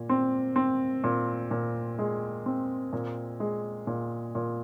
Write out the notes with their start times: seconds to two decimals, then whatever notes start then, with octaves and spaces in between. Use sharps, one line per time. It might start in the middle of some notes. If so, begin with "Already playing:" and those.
Already playing: A#2
0.09 C4
0.56 C4
1.04 A#2
1.51 A#2
1.99 G#3
2.46 C4
2.93 A#2
3.40 G#3
3.87 A#2
4.35 A#2